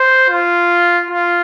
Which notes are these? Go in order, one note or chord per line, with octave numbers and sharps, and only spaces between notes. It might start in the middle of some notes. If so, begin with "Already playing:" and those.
Already playing: C5
F4
F4